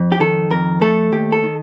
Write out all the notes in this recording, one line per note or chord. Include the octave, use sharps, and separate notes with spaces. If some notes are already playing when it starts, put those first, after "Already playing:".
Already playing: F2
G4
D#3 A4
F2 A#4
A3 A4
D#2 G4
A4
D#3